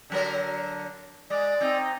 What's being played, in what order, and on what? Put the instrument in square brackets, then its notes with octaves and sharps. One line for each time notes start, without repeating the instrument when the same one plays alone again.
[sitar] D3 F#3 A#4
[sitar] G#3 [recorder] D5
[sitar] C4 D#4